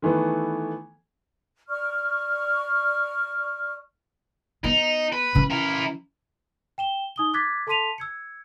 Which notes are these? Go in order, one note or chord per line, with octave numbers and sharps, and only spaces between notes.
D#3 E3 A3 B3
D5 C#6 F6
B3 D#4
B4
E3 C#4
E4 A#4
G5 E7 G7
D#4 D#6 G7
D6 F#6 G#6 A6 B6
A4 A5 C6 B6 D#7 F7
E6 G#6 C#7